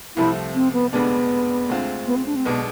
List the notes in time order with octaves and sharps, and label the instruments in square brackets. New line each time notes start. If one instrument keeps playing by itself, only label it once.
[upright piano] C2 C3 F3 A3 C4 [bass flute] E4
[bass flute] C4
B3
[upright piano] F1 F2 D3 G#3 D4 [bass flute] B3
[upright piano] D2 D3 G#3 C4 F4
[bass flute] B3
C4
D4
C4
[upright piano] B1 B2 G#3 D4 [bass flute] B3